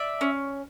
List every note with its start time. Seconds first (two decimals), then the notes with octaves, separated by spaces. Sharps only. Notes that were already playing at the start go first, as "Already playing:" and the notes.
Already playing: D5 E5
0.21 C#4